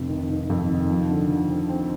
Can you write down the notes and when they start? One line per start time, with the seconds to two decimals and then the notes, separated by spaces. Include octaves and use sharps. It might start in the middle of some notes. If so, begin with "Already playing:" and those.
Already playing: F1 F2
0.09 D#3
0.29 D#3
0.50 F2
0.70 D#3
0.89 F3
1.10 D3
1.30 D3
1.50 C4
1.69 C4